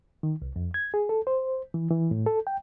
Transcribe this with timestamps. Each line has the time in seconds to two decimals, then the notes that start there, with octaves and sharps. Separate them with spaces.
0.23 D#3
0.42 C2
0.56 F2
0.74 G#6
0.94 G#4
1.09 A4
1.27 C5
1.74 E3
1.90 E3
2.11 A2
2.26 A4
2.47 G5